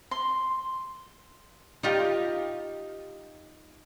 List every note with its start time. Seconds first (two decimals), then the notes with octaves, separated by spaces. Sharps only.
0.11 C6
1.83 D#4 F4 G4